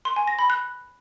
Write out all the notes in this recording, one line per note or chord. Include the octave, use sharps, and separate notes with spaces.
C6
G#5
A#6
B5
F#6